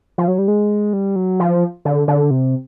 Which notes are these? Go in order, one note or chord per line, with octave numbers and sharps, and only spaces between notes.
F3
F#3
G3
G#3
G3
F#3
F3
D3
D3
C3